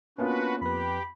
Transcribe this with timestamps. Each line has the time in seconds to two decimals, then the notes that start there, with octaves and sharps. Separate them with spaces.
0.18 A#3 B3 C#4 D4 F4 F#4 B4
0.62 F2 G4 B4 B5